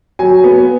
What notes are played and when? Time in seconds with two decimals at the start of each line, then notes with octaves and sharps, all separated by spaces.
0.19 F#3 G#5
0.44 B3